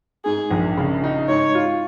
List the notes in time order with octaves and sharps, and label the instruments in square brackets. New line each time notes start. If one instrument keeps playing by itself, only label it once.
[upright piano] G#2 [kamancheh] G#4
[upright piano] A#1
C#3
D#4
[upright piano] G#2 [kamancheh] C#5
[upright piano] F4